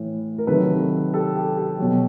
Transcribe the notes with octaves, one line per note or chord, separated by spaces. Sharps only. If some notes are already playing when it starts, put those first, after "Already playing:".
Already playing: A2 E3
A#4
C3 D#3 F#3 A4 B4
G4 A4
G4
G4
B2 F#3